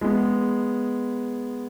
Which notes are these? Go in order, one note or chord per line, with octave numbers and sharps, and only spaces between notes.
G#3 B3